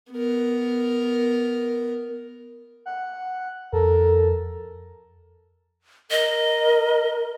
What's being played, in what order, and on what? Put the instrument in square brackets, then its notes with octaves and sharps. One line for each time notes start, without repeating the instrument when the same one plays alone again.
[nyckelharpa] B3 A#4
[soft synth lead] F#5
[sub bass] F2 [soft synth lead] A4 [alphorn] A#4
[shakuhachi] A#4 [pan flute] D#5